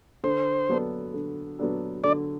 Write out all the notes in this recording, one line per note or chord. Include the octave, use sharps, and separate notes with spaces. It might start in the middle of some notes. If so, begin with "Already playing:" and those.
D3 C5
F#3 B3 D4 A4
D3
F#3 B3 D4 A4
D3 D5